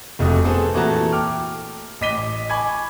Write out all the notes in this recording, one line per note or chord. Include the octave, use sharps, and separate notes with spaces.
F1 F2 A3 F#4 D#6
A3 B3 C4 G#4 A4
A#2 E3 A3 F#4 A5 A#5
G5 D6 F6
A1 D#5 D6 B6 D#7 G7
G#5 B5 C#6 D6 G#6